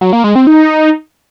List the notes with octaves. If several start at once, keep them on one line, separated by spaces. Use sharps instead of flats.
F#3
A#3
G#3
C4
D#4